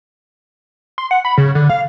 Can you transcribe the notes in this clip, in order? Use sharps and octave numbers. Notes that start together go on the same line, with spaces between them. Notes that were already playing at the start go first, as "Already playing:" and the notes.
C6
F#5
B5
C#3
D3
F5